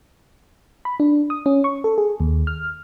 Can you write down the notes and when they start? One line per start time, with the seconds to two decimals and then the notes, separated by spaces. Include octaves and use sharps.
0.85 B5
1.00 D4
1.30 D#6
1.46 C#4
1.64 C#6
1.84 A4
1.98 G#4
2.20 D#2
2.47 F6